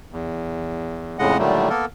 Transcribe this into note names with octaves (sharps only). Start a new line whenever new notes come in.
E2
F2 A2 C#3 G#3 D#5 F#5
A#2 D3 D#3 F#3 G3 A3
A#3 B3 A4 A#4